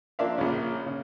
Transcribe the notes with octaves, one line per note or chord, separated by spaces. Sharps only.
F3 A#3 D4 D5 E5 F5
A#1 C#3
C#3